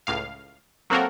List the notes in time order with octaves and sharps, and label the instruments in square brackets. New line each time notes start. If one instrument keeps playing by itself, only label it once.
[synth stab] C#2 A2 F5
F#3 A#3 C4 F#4 A4 A#4